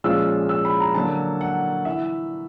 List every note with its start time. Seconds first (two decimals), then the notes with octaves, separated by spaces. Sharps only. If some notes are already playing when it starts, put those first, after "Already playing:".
0.04 A#2 F3 G#3 C#4 F4 E6
0.49 E6
0.65 B5
0.80 A#5
0.95 D3 F#3 A#3 A5
1.41 F#5
1.85 E3 E5